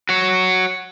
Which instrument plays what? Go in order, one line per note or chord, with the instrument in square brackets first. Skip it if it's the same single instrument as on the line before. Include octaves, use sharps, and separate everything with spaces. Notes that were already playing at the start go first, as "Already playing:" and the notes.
[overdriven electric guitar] F#4 C#5